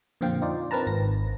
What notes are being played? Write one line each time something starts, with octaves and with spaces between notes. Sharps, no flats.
F2 A#2 D3 C4 F5 G5
D#4 F4 D5
C4 A#4 B4 A5 A#5
G#1 A#6